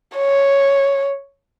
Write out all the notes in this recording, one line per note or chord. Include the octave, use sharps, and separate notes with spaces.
C#5